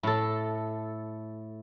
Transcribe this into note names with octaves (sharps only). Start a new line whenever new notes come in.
A2 A4